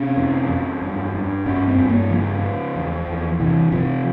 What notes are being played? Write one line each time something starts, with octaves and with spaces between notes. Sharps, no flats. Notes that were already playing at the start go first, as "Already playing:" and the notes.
Already playing: C3 C#4
F2
F2
G2
G2
G2 C#4
C4
G2
A#3
C#3 F3
C#3
E2
E2
C3 E3
C3 F3